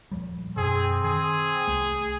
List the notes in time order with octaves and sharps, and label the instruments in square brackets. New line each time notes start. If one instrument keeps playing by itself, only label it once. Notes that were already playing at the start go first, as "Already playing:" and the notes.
[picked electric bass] D#1 F3 G3
[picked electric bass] F#2 B2 [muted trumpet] C4 [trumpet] G#4
[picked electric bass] D#3 [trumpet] G#4
[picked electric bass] C2 A3